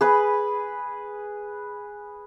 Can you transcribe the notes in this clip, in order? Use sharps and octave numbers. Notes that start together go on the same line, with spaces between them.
G#4 B4 B5